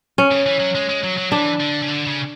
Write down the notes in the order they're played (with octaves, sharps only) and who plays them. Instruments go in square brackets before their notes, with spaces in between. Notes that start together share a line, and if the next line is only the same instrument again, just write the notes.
[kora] C#4
[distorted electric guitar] C#3
E3
F#3
G#3
G#3
F#3
F#3
[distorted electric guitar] E3 [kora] D4
[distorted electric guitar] D3
C#3
D3
C#3